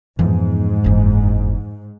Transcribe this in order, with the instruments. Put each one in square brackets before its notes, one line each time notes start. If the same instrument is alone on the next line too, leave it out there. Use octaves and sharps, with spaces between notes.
[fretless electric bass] F2 E3 F3 [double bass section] G#2 [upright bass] B3
[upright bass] F#1 E2